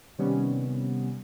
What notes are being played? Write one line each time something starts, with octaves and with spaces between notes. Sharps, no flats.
C3 D#3 G3 B3 C#4